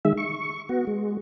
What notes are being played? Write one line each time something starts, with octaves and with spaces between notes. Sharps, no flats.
D#3 G#3 E5
C#6
B3 F#4
G#3